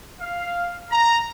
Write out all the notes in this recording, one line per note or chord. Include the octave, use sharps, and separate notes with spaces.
F5
A#5